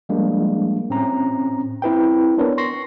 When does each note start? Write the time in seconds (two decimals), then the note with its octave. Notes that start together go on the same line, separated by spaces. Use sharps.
0.09 F3 G3 G#3 A#3 D4
0.90 A2 C4 C#4 A#5
1.82 C4 E4 B4 G5
2.38 B3 D4 A#4 B4 C#5
2.58 C6 C#6 A#6 C7